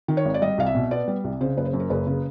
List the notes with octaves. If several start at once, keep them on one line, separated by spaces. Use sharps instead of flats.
D#3
C#5
G#1
D5
G3 D#5
C2 F5
E5
B2
B3 D5
G3
C2
C#3 C5
F#1 B4
C5
F#2
A#4
F#1 B4
C#3